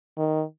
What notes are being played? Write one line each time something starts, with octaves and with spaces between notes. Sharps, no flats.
D#3